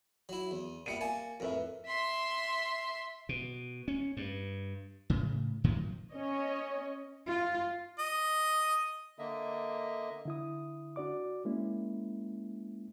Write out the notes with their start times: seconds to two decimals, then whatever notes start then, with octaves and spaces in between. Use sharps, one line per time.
0.29 F#3 E4
0.51 E2
0.86 A#2 G3 B3 E5 C#7 D#7
1.01 A#3 G#5 A5
1.40 F2 A2 A#4 B4 E5
1.86 E5 C6
3.29 B2
3.88 C#4
4.17 G2
5.10 A2 C#3
5.64 A2 D#3 F3 F#3
6.10 C#4 C#5 D#5
7.27 F4
7.99 D#5
9.19 D3 A#3 D#5 E5
10.25 D3 E4 D#6
10.96 D4 F#4 D5 D6
11.45 G#3 A#3 C#4 E4